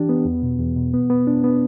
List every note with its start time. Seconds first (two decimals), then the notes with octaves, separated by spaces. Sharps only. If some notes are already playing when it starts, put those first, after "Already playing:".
Already playing: E3 D4 G4
0.09 B3
0.25 E2
0.43 B2
0.59 E2
0.76 B2
0.94 B3
1.10 B3
1.27 D4
1.44 B3